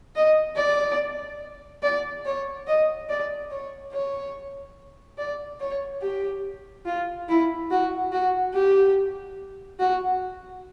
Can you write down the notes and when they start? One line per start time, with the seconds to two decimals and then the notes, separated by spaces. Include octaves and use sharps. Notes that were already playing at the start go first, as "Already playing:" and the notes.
0.16 D#5
0.56 D5
1.83 D5
2.25 C#5
2.67 D#5
3.09 D5
3.51 C#5
3.92 C#5
5.18 D5
5.60 C#5
6.02 G4
6.86 F4
7.29 E4
7.70 F#4
8.12 F#4
8.54 G4
9.79 F#4